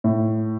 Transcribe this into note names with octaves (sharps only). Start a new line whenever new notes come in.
A2